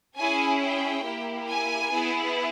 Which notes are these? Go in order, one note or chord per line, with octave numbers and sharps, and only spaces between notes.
C#4 E4 G#4 G#5
G5
A#3 E4 G4
G#5
B3 E4 G#4